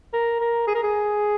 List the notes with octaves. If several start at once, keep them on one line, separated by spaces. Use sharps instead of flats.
A#4
A#4
G#4
A#4
G#4